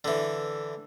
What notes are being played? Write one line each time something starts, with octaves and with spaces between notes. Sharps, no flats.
D3 E3